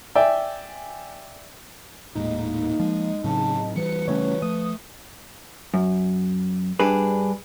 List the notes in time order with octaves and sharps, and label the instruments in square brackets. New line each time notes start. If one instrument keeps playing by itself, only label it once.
[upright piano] D5 E5 G5 G#5
[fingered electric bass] D#1 A2 G#3 [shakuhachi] A#3 [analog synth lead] D#4
[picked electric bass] F3 [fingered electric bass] G#3
[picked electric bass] A2 F#3 C4 [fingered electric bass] C#3 [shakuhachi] A5
[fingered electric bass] E3 G3 [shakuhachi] B4 [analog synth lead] C#7
[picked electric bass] C#3 A3 C#4 [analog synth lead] C#5
[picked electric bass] F3 [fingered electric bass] A3 [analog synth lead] D#6
[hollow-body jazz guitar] F#2
G2 G3 D4 G#4 B4